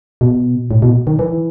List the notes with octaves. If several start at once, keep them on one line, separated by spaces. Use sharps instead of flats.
B2
A2
B2
D#3
E3